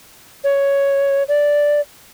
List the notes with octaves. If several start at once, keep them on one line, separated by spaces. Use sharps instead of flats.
C#5
D5